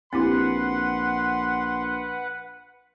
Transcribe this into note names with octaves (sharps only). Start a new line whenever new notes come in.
A#1 C4 E4 G4 B4 F#5 C6